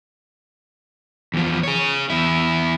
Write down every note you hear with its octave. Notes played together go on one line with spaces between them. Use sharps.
E2 F3
G#4 C#5
E2 E4